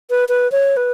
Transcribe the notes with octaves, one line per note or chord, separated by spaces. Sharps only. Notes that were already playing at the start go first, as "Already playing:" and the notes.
B4
B4
C#5
B4